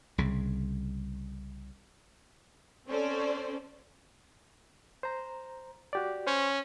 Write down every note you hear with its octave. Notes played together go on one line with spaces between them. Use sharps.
C2 C#3
C4 C#4 A4 C5 D5
C5 A#5
F#4 G4 D5
C#4 C5